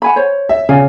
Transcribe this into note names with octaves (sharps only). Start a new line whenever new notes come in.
F#5 G#5 B5
C5 C#5
E5
C#3 D5 F5 G#5